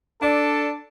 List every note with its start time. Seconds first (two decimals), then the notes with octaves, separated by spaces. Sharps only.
0.22 D4 A4 D5